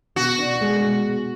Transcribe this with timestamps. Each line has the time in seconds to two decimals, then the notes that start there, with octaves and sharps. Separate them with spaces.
0.16 B2 F#4
0.39 D4
0.61 G#3
0.83 B2
1.05 B2